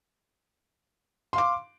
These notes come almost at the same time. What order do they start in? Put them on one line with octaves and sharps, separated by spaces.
C6 F5 D6